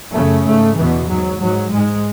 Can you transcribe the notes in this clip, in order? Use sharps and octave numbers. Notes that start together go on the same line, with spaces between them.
F#2 C#3 A3
G#2 A3
E2 B2 E3
G#2 F#3
G#2 F#3
G#2 G#3